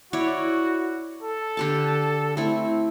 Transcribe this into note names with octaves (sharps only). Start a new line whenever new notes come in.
E4 F#4 C#5 D5
A4
D3 G4 A5
A3 C4 E4